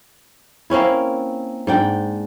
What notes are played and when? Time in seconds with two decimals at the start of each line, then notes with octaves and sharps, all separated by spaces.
0.70 A#3 C4 C#4 E4
1.67 G#2 D4 G5